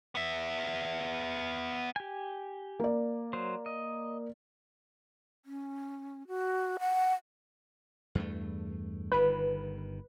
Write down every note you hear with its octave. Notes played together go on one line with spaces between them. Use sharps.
B3 E5
G4 G#5
A#3 D5
F#3 C5
D#5
C#4
F#4
F#5
E2 G2 A3
G1 D#3 B4